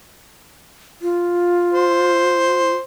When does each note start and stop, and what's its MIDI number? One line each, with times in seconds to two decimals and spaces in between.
1.02 2.73 65
1.74 2.80 72